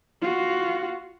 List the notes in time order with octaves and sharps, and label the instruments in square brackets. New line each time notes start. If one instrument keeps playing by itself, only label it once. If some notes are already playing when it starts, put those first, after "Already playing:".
[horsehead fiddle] F4 F#4